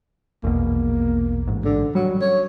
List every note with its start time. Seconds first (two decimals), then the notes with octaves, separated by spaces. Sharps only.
0.44 A#1 E2 B2 A#3
1.47 A1 G#2
1.64 D3
1.95 F#3 G3
2.21 C#5